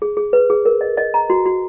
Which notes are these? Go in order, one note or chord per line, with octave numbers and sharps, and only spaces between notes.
G#4
G#4
B4
G#4
A#4
D#5
D#5
A#5
F#4
F#4